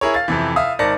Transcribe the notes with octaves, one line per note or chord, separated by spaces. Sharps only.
E4 G#4 A#4 C#5
F5 A6
F2 C3 E3
E5 F5 D#6
G#1 A#4 D5 A5 A#6 C#7